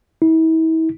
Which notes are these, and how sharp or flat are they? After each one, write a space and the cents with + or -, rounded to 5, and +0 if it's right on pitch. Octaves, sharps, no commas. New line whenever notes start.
E4 -40